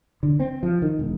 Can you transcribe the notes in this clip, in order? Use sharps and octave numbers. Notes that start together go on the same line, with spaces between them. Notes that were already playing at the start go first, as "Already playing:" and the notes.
D3
C4
F3
D#3
E1